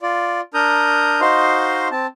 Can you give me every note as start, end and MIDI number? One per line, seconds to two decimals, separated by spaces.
0.02 0.41 65
0.02 0.41 74
0.54 1.21 62
0.54 1.21 70
0.54 1.21 82
0.54 1.21 87
0.54 1.21 91
1.21 1.88 63
1.21 1.88 66
1.21 1.88 72
1.21 1.88 75
1.21 1.88 77
1.21 1.88 84
1.91 2.07 60
1.91 2.07 81